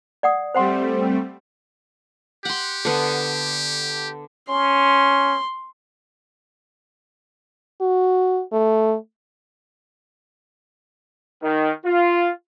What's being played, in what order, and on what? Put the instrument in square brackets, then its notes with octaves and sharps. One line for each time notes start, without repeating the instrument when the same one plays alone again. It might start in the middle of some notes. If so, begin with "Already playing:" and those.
[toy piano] D5 F#5 D#6
[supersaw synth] G3 A3 C4 [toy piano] C5 F#5 C6
[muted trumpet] G4 [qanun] F#5 C6
[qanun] D3 B3
[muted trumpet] C#4 [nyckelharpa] C6
[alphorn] F#4
A3
[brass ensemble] D#3
F4